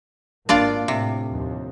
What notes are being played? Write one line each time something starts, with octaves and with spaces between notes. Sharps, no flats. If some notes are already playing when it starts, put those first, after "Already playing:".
G#1 A#3 D4 F4 D5
A2 C3
D#2 F3